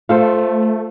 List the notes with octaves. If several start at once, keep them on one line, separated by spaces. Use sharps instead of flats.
A3 F4 A4 C5